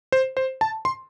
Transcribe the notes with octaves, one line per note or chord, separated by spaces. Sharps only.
C5
C5
A5
C6